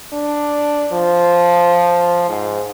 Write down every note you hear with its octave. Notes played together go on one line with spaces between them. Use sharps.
D4
F3
G#2